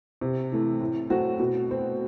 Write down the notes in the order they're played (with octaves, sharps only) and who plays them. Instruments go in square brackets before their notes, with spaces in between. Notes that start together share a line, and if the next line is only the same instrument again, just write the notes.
[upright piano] C3
E3 A3
A2
F#3 A3 C4 F#4
B2
A3 C4